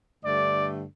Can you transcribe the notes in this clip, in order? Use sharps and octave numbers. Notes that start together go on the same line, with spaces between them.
G2 D3 A3 D5